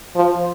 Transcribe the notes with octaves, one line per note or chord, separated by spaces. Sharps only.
F3